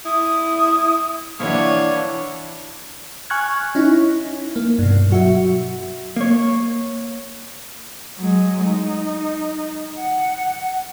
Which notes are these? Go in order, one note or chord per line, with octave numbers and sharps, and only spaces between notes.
E4 D#6
E3 A#3 D4 C#5 F#5
G#5 C#6 F6 F#6 G#6
C#4 D#4 E4
A#3
G2 B2
F#3 F#4 E5
A#3 C#5
F#3 G#3
D#4
F#5